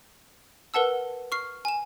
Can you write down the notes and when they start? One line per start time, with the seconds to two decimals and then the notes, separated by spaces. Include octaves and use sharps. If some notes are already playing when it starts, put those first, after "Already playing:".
0.74 A#4 B4 F#5 A5 E6
1.32 C#6 F6 C7
1.65 G#5 E7